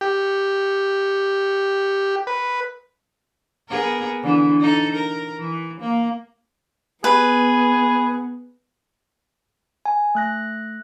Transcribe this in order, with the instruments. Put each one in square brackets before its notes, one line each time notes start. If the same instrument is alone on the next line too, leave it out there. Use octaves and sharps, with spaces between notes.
[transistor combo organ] G4
B4
[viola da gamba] B3 G#4 A#4
D3 E3
D#4 A4
A#4
E3
A#3
[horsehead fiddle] B3 [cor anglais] G#4 [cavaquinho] B4
[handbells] G#5
A3 F#6 A#6